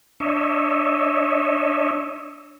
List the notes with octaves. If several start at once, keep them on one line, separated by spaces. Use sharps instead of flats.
D4 C#5 D#5 E5